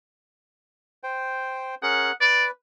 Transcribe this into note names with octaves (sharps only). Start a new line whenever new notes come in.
C5 G5
C#4 G#4 A#4 F#5
B4 D5